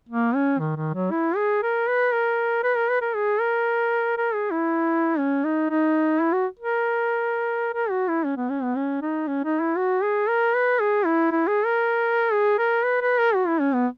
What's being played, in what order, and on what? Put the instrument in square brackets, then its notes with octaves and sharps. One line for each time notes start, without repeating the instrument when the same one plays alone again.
[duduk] A#3
C#4
D#3
D#3
F#3
E4
G#4
A#4
B4
A#4
B4
A#4
B4
A#4
G#4
A#4
A#4
G#4
E4
C#4
D#4
D#4
E4
F#4
A#4
A#4
F#4
E4
C#4
B3
C#4
B3
C#4
D#4
C#4
D#4
E4
F#4
G#4
A#4
B4
G#4
E4
E4
G#4
A#4
G#4
A#4
B4
B4
A#4
F#4
E4
C#4
B3